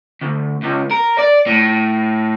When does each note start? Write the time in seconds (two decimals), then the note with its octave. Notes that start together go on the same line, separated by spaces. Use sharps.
0.21 D2
0.63 C#2
0.91 A#4
1.19 D5
1.47 A2